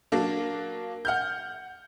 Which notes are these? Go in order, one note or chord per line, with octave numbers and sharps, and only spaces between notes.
F#3 A#3 D4
F#5 F6 G6